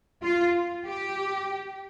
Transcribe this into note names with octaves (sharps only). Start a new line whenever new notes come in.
F4
G4